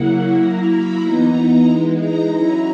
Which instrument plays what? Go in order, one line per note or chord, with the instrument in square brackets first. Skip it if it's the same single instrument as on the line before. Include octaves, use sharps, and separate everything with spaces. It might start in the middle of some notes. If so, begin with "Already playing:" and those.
Already playing: [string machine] C#3 F#3 A#3 E4 F#5
F#3 A#3 E4 A#5
B5
E3 B3 D#4 A#5
E3 G#3 D#4
A#5
F#3 C#4 E4